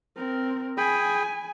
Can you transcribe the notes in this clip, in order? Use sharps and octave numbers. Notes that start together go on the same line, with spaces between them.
C4 A#4
G#4 G5 G#5 B5